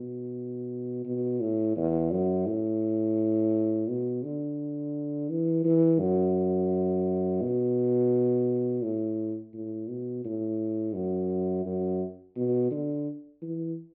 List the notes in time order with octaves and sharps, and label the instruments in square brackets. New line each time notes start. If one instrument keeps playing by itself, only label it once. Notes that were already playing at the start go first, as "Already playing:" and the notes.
Already playing: [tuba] B2
B2
A2
E2
F#2
A2
B2
D3
E3
E3
F#2
B2
A2
A2
B2
A2
F#2
F#2
B2
D3
E3